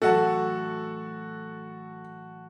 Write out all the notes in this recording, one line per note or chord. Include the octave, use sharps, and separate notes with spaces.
A2 E3 F#3 F#4 A4 F#5 A5